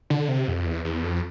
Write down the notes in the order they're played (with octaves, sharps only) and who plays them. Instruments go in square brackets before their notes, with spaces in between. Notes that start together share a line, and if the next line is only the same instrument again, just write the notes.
[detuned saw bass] D3
C3
F2
E2
E2
F2